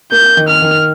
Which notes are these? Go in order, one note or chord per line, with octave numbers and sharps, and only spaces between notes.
A#3 G6
D#3
F6
D#3